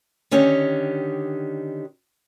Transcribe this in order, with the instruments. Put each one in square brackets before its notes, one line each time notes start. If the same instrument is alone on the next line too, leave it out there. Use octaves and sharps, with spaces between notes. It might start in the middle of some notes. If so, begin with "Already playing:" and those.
[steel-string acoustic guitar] D3 D#3 C#4 G4